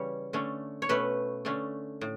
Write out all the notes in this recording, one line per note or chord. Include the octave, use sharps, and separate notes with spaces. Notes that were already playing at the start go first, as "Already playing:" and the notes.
Already playing: C#3 E3 G3 C#4 C#5
D3 A3 C#4
C#5
B2 A3 C#4 B4
D3 A3 C#4
A2